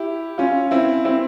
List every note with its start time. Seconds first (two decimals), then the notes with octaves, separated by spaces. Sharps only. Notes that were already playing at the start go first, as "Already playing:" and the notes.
Already playing: E4 G4
0.38 C#4 F4
0.71 C4 E4
1.05 C4 E4